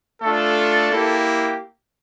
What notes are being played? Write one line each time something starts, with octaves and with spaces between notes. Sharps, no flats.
A3 D4 F4 A4
A#3 E4 G4